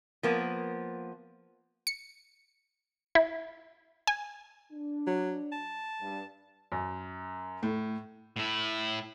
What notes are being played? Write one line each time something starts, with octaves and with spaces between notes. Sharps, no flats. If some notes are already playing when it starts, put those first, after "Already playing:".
F3 A#3 B3
C#7
E4
G#5
D4
F#3
A5
G2
F#2
A2
A2 E4